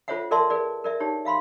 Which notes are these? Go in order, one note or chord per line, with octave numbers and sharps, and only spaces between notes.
F4 A4 C5 C#5 E5 F#5
A4 A#4 D5 E5 A5 C6
G#4 A#4 B4 D5
A#4 D5 E5
D#4 G4 C#5
E5 F5 B5 C6